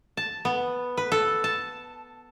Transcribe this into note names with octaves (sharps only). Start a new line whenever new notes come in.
A5
B3
B4
A4
A5